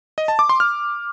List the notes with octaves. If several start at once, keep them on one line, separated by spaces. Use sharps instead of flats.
D#5
A5
D6
C6
F6